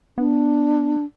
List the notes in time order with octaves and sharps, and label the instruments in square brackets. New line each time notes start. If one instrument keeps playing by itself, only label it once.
[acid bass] B3 [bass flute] D4